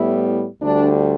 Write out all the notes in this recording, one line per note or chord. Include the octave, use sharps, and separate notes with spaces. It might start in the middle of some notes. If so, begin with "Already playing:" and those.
Already playing: A2 G3 B3 E4
D2 D3 G3 D4